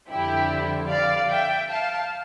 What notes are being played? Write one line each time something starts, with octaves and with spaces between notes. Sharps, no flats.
F2 D3 G3 E4 G4
D5 F5
E5 G5
F5 A5